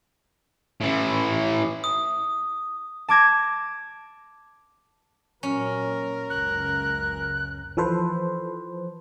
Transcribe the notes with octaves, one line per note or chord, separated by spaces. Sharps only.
A2 E3
D#6
A5 D6 G#6 A#6
A#2 F#3 C#4 A#4
F#1 C#2 F#6
E3 F3 A4 B4 C5